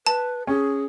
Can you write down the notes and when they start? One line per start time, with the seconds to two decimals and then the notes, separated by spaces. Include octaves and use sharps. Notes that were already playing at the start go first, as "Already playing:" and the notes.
0.07 B4 A5
0.47 C#4 G#4